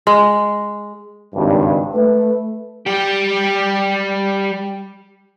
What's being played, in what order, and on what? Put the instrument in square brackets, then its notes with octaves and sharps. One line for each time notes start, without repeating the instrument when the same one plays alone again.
[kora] G#3
[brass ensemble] G#1 C#2 G2
A3 B4
[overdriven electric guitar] G3 G4